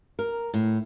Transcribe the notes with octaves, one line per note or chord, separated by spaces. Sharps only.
A#4
A2